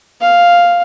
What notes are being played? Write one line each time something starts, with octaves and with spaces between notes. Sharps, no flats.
F5